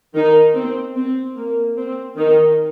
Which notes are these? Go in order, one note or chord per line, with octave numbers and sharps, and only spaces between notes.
D#3 D#4
C4
C4
A#3
C4
D#3 D#4